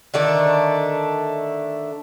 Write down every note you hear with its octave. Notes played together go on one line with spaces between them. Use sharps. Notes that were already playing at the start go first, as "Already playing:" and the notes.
D3 D#3 A3 D4